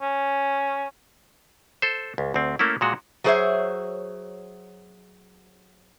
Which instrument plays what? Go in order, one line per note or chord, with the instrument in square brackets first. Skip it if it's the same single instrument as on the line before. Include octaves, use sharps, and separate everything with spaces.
[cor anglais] C#4
[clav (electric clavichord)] A4 C5
C#2
D2 C4
A3 A#3 C#4 E4
A#2 G#3 F#4
[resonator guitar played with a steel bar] F#3 A3 G#4 C5 C#5 E5